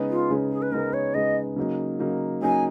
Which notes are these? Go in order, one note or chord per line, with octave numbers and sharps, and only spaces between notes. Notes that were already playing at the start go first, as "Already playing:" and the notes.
Already playing: C#3 G#3 B3 D#4
F4
C#3 G#3 B3 D#4
G#4
B4
C#3 G#3 B3 D#4 A#4
C#5
C#3 G#3 B3 D#4 D#5
C#3 F#3 A#3 D#4
C#3 F#3 A#3 D#4
C#3 F#3 A#3 D#4 G#5